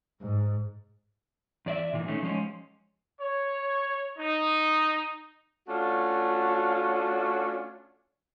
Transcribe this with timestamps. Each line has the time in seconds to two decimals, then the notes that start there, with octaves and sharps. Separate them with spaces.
0.21 G#2
1.66 E2 D5 E5
1.93 A#2 D#3 E3
2.08 D#3 A3 C#4
2.22 F3 G#3 C#4
3.20 C#5
4.18 D#4
5.68 A3 C#4 D4 F4 F#4